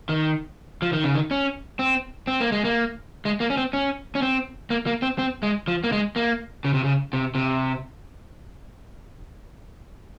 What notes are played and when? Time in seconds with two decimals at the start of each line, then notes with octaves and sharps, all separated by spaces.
0.09 D#3
0.82 F3
0.93 D#3
1.04 C#3
1.14 D#3
1.31 C#4
1.79 C4
2.27 C4
2.41 A#3
2.52 G#3
2.65 A#3
3.25 G#3
3.40 A#3
3.50 C#4
3.57 C4
3.73 C#4
4.15 C#4
4.22 C4
4.70 A#3
4.86 A#3
5.02 C4
5.18 C4
5.43 G#3
5.67 F3
5.84 A#3
5.92 G#3
6.16 A#3
6.64 C#3
6.74 C3
6.84 C#3
7.13 C3
7.35 C3